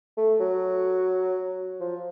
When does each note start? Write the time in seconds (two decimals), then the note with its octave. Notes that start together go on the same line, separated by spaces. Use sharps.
0.17 A3
0.40 F#3
1.80 F3